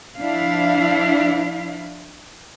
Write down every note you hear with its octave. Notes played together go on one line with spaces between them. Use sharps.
F3 D4 E4 F5